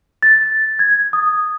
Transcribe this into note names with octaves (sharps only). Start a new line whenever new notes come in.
A6
G#6
D#6